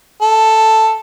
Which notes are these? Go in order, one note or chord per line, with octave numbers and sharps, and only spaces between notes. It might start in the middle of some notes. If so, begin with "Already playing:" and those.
A4